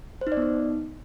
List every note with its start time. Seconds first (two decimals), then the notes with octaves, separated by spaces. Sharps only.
0.21 C5
0.27 D#4
0.32 D5
0.37 B3
0.42 D#4